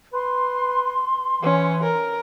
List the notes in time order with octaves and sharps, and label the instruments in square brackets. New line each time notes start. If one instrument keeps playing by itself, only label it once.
[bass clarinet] B4 [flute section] C6
[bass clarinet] E3 [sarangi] C#4
[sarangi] A#4